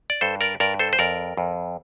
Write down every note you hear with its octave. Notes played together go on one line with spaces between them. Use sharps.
D5
G2 A4 C5
A#4 D5
G2 A#4 D5
A4 C5
C5
F2 A#4 D5
F2